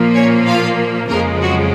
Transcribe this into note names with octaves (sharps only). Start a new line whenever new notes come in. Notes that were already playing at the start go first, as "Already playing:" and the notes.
Already playing: A#2 F3 A#3
C#4 C#5
F4 F5
F2 C#3 F3 G#3 A#3 A#4
F#3 F#4